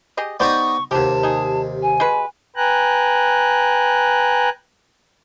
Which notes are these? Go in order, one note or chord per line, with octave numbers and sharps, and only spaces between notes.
G4 G#4 D#5
B3 D#4 G4 C5 D5 D#5 C#6
D#2 C3 F#3 G4 A5
D#4 G#4
G#5
G#3 F#4 B4
B4 G5 G#5 A#5 F#6